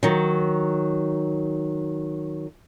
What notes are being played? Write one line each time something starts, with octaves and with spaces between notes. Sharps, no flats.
D#3 F#3